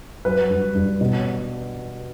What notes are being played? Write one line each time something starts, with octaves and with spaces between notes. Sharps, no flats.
F#3 B4
G2
G2
B2